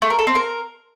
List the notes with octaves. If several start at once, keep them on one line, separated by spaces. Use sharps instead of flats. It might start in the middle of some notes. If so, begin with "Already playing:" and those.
A3
A#4
A4
C4
A#4